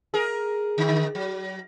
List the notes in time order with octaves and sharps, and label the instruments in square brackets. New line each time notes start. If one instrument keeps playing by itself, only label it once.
[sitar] G#4 A#4
D3 D#3
F#3